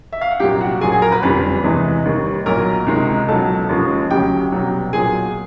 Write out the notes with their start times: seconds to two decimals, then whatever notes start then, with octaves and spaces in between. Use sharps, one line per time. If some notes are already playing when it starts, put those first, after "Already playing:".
0.13 E5
0.21 F5
0.31 F#5
0.40 C2 A#2 F#3 G4 G5
0.61 F#4 F#5
0.81 A#1 A#2 F#3 G#4 G#5
0.92 G#4 G#5
1.02 A#4 A#5
1.12 B4 B5
1.22 F#1 F2 D3 G3 B4 B5
1.64 E2 C3 E3 G#3
2.05 D#2 D#3 G3
2.46 B1 A#2 F#3 A#4 A#5
2.87 C#2 C3 D#3 G#3
3.28 C#2 B2 F#3 A4 A5
3.69 D#2 C#3 F3 G#3
4.10 D2 C#3 F#3 G4 G5
4.52 C2 B2 F#3
4.93 B1 A#2 F#3 G#4 G#5